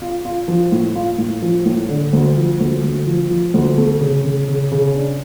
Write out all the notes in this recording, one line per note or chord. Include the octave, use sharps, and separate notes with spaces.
F4
F4
F3
A2
F4
A2
F3
A2
D3
D2
F3
D2
D2
F3
F3
D2
A3
C#3
C#3
C#3
C#3
D4